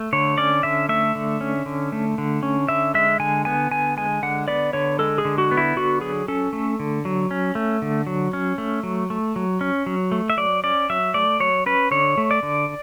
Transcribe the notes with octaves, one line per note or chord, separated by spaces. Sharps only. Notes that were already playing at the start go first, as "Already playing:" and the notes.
Already playing: A3
D3 C#5
C#4 D5
D3 E5
A3 E5
D3
C#4
D3
A3
D3
C#4
D3 E5
G#3 E5
D3 G#5
B3 G#5
D3 G#5
G#3 G#5
D3 F#5
B3 D5
D3 C#5
G#3 A4
G#4
D3
F#4
B3
E4
D3 F#4
F#3 G#4
C#4 A4
A3
D3
F#3
C#4
A3
D3
F#3
C#4
A3
F#3
A3
F#3
C#4
F#3
A3
E5
F#3 D5
C#4 D5
F#3 E5
A3 D5
F#3 C#5
C#4 B4
D3 C#5
A3
D5
D3